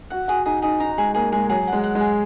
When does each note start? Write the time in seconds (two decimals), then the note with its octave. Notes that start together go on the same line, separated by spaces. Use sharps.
0.10 F#4 F#5
0.28 F#4 G#4
0.46 D#4 G#4
0.62 D#4 G#4
0.80 D#4 A#5
0.98 G#3 G#4
1.14 A#3 G#4
1.32 G#3 G#4
1.49 F#3 G#4
1.67 F#5
1.72 G#3
1.84 F#5
1.95 G#3
2.01 G#4